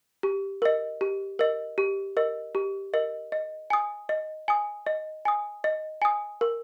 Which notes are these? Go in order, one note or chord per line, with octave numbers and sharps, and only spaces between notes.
G4
A#4 D#5
G4
A#4 D#5
G4
A#4 D#5
G4
A#4 D#5
D#5
G#5 D#6
D#5
G#5 D#6
D#5
G#5 D#6
D#5
G#5 D#6
A#4